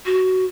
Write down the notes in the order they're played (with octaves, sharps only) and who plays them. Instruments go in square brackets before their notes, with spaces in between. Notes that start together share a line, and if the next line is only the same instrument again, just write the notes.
[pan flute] F#4